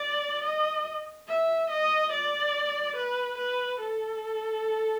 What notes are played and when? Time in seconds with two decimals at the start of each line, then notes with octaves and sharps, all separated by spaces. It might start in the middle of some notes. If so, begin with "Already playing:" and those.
Already playing: D5
0.44 D#5
1.28 E5
1.70 D#5
2.12 D5
2.96 B4
3.38 B4
3.80 A4